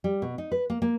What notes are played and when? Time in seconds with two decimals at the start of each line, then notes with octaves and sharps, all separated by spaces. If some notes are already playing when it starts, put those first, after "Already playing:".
0.04 G3
0.22 B2
0.38 D#4
0.52 B4
0.70 A#3
0.82 A#3